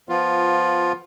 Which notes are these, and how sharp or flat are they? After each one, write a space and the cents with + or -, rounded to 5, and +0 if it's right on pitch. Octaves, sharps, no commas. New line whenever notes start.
F3 +0 B3 +0 F4 +10